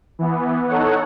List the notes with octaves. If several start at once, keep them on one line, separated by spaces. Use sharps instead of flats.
E3 B3
D#4 A4 C#5 F#5